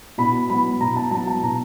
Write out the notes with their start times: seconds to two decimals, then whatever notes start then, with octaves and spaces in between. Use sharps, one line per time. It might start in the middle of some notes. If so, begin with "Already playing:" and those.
0.18 B2 B5
0.50 F#3 B3 B5
0.81 B2 A#5
0.96 A5
1.11 F#3 B3 A5
1.27 A5
1.43 B2 A#5